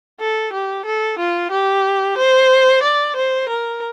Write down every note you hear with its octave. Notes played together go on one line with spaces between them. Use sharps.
A4
G4
A4
F4
G4
C5
D5
C5
A#4